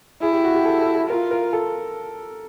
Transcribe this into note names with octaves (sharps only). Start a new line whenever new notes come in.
E4 G#4
G4
F#4
G4
A4
A4
A4
F4 A#4
A#4
A4